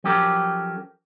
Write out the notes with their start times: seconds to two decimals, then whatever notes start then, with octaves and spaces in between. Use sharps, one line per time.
0.04 F3 F#3 C#4 G4 A4 A#4